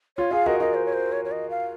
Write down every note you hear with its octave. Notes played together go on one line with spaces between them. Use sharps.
F4 C#5
F4 G#4 F5
F#4 A#4 D#5
F#4 A#4 D#5
C5
C#5
C5
C#5
C#5
D#5
F5